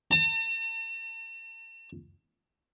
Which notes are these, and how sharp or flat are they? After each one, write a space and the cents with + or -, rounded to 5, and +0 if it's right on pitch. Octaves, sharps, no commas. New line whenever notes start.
A5 +45